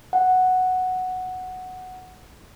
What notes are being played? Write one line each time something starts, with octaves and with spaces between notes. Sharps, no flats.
F#5